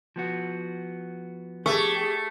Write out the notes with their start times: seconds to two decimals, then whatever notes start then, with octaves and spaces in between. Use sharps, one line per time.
0.16 F3 B3 F#4
1.66 A3 G4 G#4 C#6